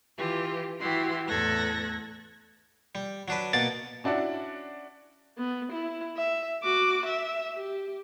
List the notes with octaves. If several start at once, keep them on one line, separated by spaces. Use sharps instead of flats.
E3 F4 G4
E3 E4 F#4 G4 C6
E2 A2 A4 F#6 G#6 A#6
G3
F#3 D4 B4
B2 A#3 B3 A6
C#4 D4 E4 F#4 D5
B3
E4
E5
F#4 D6
E5
G4